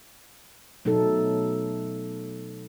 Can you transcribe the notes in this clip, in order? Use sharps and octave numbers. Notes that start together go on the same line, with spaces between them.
B2 F#3 A3 D#4 A4